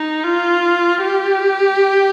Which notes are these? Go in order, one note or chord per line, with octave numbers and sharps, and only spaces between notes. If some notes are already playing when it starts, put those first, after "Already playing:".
Already playing: D#4
F4
G4